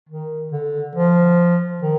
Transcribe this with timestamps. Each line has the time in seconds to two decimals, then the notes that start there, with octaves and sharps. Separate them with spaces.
0.09 D#3
0.51 D3
0.95 F3
1.82 D#3